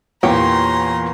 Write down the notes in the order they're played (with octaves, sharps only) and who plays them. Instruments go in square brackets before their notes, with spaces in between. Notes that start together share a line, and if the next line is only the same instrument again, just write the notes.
[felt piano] E2 A#2 E3 [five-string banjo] G4 C#5 G5 [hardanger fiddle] A#5 C6